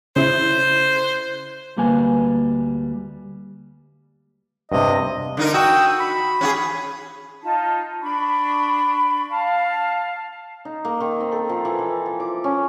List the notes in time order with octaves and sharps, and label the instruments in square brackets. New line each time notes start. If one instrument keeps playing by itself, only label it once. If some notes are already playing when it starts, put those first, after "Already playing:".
[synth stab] C#3 E4 [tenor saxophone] C5
[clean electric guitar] D2 G3 A#3 B4 G#5
[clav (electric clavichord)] G2 C3 [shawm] D#5
[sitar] D3 D#4 A#4
[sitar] F#4 [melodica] G5 D#6 E6
[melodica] B5
[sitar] C#4 F#4 G#4
[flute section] D#4 F4 A5
D4 B5 C#6
F5 A5
[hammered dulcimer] D#4
A#3
D#3
C4
A4
F3
E3
E3
F3
D6
C#4